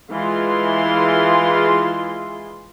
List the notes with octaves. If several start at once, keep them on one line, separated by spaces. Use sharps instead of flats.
E3 G#3 F4 G#4 C6